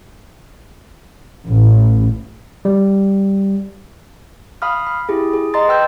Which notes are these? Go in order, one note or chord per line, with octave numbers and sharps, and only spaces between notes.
A1
G3
F5 B5 D#6 F6
B5
E4 G4 G#4
G#4
D#5 A#5 C6 A6
B4 G5 E6 G6